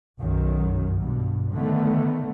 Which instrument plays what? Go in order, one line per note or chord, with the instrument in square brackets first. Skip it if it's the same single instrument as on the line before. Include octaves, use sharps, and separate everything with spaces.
[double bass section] B1 F#2 D#3
G2 B2
D3 D#3 A3 B3